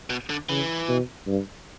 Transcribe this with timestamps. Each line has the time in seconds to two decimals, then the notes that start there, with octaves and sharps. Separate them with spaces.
0.10 B2
0.30 D3
0.49 C#3 E3
0.89 B2
1.27 G2